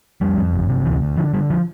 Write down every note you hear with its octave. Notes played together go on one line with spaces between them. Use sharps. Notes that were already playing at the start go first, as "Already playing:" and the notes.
F2 G3
F2
G1
C3
D2 E3
D2
D3 F3
D3 G3
F3